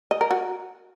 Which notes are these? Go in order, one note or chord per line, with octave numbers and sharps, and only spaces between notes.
D#5
A#4
F#4